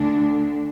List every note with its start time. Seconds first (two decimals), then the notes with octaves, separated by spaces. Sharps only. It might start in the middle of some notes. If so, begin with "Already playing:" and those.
Already playing: D2 D3 D4